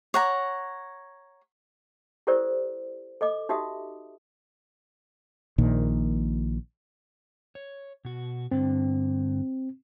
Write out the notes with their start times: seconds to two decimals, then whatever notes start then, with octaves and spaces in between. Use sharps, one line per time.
0.14 C#5 F#5 A#5
2.27 E4 G4 A4 A#4 C5 D5
3.21 A4 D#5 D6
3.49 D#4 F#4 G4 E5 D#6
5.58 A#1 A#2 D#3
7.55 C#5
8.05 B2 F#4
8.51 G2 D3 C4